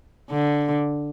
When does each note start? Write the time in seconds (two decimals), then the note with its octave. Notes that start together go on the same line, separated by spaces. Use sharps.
0.30 D3